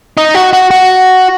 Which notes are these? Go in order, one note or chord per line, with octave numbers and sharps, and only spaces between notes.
D#4
F#4
F#4
F#4